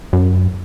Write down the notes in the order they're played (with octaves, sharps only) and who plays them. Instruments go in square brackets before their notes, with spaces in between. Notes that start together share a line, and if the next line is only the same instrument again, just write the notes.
[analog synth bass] F#2